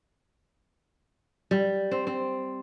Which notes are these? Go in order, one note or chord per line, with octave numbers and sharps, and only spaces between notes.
G3
C4
C4